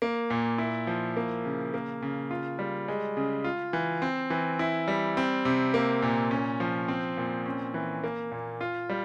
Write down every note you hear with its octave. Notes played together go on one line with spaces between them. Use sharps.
A#3
A#2
E4
F3
A#3
C#3
A#3
C#3
F4
G3
G#3
C#3
F4
E3
C4
E3
E4
G3
C4
C3
A#3
A#2
C#4
F3
C4
A#2
C#4
E3
A#3
A#2
F4
G3